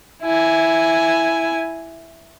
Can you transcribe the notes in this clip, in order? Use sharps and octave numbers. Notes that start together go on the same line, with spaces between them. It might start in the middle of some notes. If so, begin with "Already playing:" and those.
E4 G#5